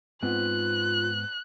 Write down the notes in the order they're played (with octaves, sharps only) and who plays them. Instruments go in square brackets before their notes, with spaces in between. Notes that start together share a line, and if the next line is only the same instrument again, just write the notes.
[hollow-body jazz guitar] G#2 B3 C4 [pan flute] F4 [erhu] F#6